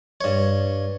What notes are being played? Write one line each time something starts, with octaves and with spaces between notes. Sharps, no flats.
G2 C#5